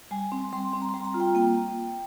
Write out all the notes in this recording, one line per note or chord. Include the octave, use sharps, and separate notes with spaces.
G3 G#5
C4
G3 C6
C4
A#5
G3 C6
A#5
F4
G5
A#3 G5